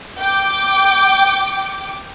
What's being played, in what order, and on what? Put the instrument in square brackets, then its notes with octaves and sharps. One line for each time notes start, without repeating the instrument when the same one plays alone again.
[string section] G5 D6